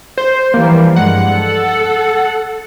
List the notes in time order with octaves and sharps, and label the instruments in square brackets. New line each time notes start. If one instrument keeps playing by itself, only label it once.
[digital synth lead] C5
[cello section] E3 F3 G3 [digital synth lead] A#3
[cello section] G2 G#3 [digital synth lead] F#5
[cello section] A4